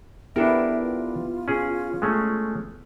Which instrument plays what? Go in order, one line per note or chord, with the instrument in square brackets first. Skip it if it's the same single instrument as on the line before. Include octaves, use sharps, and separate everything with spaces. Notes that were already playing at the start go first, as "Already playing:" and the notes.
[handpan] B3 E4 G4 [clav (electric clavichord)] D4 A4 A#4 [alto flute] E5
[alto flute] F4
[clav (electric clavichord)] C#4 G#4
G#3 A3 C#4